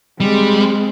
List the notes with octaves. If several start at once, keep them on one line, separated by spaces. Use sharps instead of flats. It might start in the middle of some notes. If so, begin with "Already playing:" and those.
G3 G#3 C4